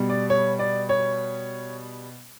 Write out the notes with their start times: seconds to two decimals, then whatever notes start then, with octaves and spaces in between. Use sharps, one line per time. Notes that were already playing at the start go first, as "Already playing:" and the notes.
Already playing: B2 G3
0.09 D5
0.30 C#5
0.59 D5
0.89 C#5